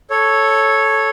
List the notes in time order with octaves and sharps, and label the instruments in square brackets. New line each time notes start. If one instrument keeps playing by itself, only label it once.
[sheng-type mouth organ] A4 C#5